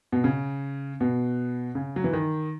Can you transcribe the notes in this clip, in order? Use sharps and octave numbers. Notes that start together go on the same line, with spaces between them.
B2
C#3
B2
C#3
F#3
E3
D#3